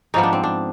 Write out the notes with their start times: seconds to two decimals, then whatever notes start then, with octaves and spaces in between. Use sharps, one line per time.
0.14 G#2 F3 B3 D#4
0.23 D4
0.33 C4
0.44 D4